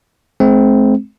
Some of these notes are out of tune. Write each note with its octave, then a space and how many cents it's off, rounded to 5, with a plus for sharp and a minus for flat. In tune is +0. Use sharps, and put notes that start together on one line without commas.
G#3 +45 C4 +0